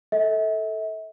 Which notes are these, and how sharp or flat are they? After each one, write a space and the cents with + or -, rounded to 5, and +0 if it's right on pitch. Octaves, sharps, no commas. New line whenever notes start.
A4 +0 E5 -40